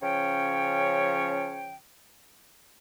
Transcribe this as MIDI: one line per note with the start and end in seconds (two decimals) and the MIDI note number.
0.02 1.75 49
0.02 1.75 53
0.02 1.75 61
0.02 1.75 73
0.02 1.75 79